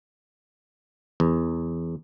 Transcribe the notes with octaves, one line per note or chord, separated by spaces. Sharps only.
E2